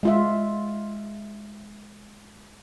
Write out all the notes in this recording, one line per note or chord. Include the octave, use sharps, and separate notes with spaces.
G#3 F4 E5